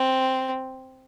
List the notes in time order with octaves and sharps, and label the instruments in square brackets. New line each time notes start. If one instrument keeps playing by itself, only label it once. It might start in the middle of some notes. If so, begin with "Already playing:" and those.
Already playing: [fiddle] C4